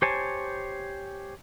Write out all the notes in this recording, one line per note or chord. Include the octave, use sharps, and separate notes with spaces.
G4 C5 C#5 G#5 A5